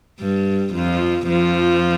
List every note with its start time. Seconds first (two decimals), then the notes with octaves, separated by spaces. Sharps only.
0.20 G2 G3
0.74 F2 F3
1.28 F2 F3